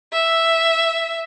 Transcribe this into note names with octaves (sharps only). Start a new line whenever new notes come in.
E5